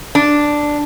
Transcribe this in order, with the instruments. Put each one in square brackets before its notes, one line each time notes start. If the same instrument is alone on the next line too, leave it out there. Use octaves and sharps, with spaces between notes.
[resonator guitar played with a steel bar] D4